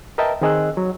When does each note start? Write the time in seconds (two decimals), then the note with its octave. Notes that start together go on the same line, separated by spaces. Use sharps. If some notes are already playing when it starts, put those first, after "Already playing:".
0.18 A#4 B4 D#5 E5 G5 A5
0.41 D#3 C4 G#4 D#5 E6 F#6
0.77 F#3